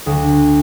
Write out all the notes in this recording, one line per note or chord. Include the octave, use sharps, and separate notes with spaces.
D2